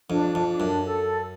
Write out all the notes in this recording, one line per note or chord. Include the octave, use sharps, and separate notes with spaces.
F2 D4
F2
D4
F#2
A4